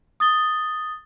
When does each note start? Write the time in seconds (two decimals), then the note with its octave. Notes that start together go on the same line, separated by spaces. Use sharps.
0.20 D#6 A6 G7